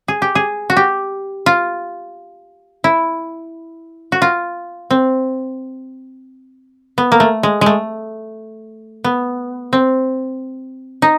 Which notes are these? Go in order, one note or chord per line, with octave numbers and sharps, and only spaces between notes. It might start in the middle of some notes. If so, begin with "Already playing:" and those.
G#4
G4
G#4
F#4
G4
F4
E4
F#4
F4
C4
B3
A#3
A3
G#3
G#3 A3
B3
C4
D#4